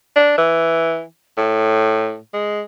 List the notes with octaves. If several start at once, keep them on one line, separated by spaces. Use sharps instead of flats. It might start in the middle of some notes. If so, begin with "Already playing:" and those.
D4
E3
A2
G#3